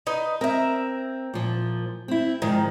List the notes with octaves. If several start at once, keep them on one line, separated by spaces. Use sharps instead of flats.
D#4 B4
C4 A#4 E5
A#2 F3
C4 E4
G#2 D#3 F3